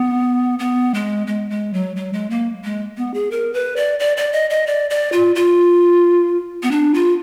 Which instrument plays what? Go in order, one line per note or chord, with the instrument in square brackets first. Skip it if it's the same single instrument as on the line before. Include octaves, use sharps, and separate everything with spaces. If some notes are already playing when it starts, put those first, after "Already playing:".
Already playing: [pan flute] B3
B3
G#3
G#3
G#3
F#3
F#3
G#3
A#3
G#3
B3
G#4
A#4
B4
D5
D5
D5
D#5
D#5
D5
D5
F4
F4
B3
D4
F4